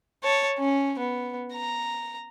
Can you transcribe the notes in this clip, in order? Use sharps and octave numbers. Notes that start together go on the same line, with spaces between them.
C#5 A5
C#4
B3
A#5